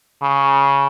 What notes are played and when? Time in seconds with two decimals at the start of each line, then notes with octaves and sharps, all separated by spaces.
0.22 C#3